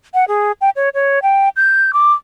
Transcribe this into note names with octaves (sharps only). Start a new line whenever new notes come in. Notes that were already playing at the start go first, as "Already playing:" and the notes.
F#5
G#4
G5
C#5
C#5
G5
G6
D6